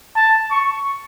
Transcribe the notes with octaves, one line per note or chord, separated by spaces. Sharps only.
A5
C#6